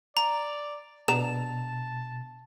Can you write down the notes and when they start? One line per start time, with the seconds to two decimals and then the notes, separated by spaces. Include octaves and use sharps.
0.17 D5 A#5
1.08 B2 B3 D4 A5 A#5 E7